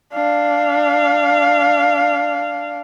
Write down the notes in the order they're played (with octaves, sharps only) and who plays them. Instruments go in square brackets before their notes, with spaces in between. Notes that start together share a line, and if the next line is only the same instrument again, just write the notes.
[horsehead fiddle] D4 F5